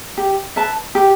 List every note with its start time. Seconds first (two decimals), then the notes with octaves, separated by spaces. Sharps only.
0.18 G4
0.56 B4 E5 A5
0.95 G4